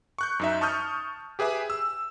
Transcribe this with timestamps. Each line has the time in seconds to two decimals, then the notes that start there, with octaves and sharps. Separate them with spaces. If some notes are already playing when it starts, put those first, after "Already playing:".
0.18 C#6 F#6 G6
0.40 F#2 D#4 E5
0.61 A5 C#6 D#6 F6 G6
1.39 G4 G#4 B4 E5 G#5
1.70 E6